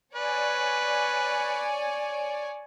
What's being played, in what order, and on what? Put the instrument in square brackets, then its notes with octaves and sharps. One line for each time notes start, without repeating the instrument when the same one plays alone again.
[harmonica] B4 [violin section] C#5 D5 G#5